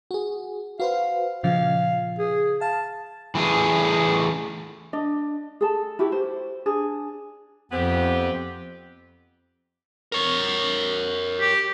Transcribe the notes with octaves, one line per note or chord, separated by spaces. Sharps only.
F#4 G#4
F#4 B4 C5 F5
A#2 C#3 F3 F5
G#4
F5 A5
E3 A3 G#4
D4 D#5
G#4 A4 A5
E4 F#4 G4
C5
D4 G#4
F2 B3 C4 G4
A#4 C#5
G4